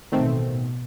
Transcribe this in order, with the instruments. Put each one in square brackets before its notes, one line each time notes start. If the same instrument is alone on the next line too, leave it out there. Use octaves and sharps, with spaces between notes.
[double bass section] A1 B2 [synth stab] D#3 A3 C4